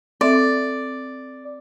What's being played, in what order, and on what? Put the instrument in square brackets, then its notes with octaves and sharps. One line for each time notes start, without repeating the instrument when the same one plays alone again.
[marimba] C4 A4 E5 [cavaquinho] D5